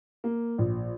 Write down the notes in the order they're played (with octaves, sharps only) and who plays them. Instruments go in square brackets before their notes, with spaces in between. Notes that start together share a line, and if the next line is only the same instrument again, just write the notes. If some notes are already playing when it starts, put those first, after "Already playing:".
[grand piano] A#3
A#1